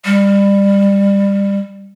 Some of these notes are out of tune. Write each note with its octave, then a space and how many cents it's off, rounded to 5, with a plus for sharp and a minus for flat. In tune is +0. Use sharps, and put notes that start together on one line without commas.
G3 +25